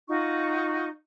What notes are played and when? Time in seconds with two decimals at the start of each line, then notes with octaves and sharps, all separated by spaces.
0.08 D#4 F4 F#4 C#6